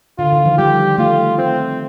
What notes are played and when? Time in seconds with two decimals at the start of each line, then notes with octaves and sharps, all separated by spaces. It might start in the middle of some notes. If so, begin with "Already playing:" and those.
0.19 D3 F4
0.32 D#3
0.45 F3
0.58 G3 G4
0.98 A3 F4
1.38 C4